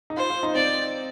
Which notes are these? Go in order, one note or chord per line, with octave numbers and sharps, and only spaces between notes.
D#4
F4 C5
F4
D#4
C4 D5